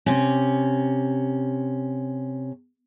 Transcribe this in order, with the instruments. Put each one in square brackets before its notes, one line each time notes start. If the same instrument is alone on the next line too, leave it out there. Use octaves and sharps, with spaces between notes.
[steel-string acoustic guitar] C3 C#4